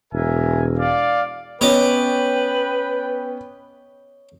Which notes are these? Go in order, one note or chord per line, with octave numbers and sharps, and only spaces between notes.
E1 A#4 E5 G#5
D5 F5
B3 C#4 B4 C#5 D#5 G5 D6